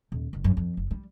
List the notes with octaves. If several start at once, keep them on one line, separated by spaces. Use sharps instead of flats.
D#1
F#1
F#2
F2
F#1
G3